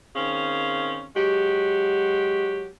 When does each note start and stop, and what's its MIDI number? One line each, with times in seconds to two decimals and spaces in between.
0.16 1.05 51
0.16 1.05 60
0.16 1.05 61
0.16 1.05 68
0.16 1.05 77
1.14 2.68 54
1.14 2.68 56
1.14 2.68 66
1.14 2.68 67